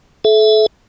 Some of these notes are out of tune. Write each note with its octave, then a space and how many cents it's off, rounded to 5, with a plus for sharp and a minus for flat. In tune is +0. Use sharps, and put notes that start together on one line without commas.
A4 -35 E5 +0